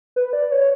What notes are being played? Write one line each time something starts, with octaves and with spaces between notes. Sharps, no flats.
B4
D5
C#5